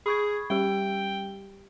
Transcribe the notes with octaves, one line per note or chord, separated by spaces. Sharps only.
G#4 B5 C#6 G#6
G3 G4 G5